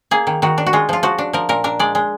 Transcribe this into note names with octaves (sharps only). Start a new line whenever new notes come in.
A#3 G#4
D#3
D#3 F#4
D4
F#4
G#3 F4
F3 F4
F3 F#4
D4
F3 A#4
A#2 A#4
D4 A#4
G#3 D5
G#3